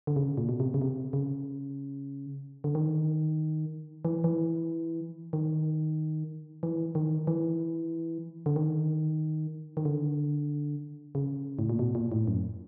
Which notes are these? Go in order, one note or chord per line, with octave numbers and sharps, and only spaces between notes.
D3
C#3
A#2
B2
C3
C#3
C3
C#3
D3
D#3
E3
E3
D#3
E3
D#3
E3
D3
D#3
D#3
D3
C#3
A2
A#2
B2
A#2
A2
F#2